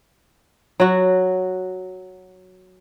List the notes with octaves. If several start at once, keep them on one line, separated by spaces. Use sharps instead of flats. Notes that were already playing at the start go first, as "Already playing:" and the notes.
F#3 F#4